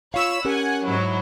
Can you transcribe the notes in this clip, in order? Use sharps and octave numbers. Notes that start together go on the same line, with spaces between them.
F4 C#5 F5 B5 E6
C#4 G4 A#4 F#5 G#5
G#2 F#3 E4